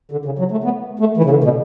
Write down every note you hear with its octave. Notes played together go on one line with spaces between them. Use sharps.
D3
C#3
F#3
A3
B3
A3
E3
C#3
D3
B2